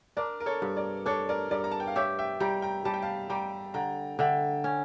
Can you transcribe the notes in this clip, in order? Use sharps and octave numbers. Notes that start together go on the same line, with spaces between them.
D4 A#4 D5
A#4
A4 C#5
G2
A#4 D5
D4 A4 C#5
A#4 D5
G2 A#4 D5
A#5
A5
G5
F5
G4 C#5 E5
E5 G5
G3 G5 A#5
G5 A#5
G3 A5
G5
F5 A5
G3 G5 A#5
D3 G5 A#5
D3 E5 G5
C#4